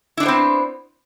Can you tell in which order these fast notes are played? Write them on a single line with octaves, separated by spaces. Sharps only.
E4 D4 B3 C5 C4